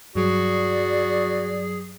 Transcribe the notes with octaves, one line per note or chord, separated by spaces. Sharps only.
G2 F#3 F#4 G#4 D5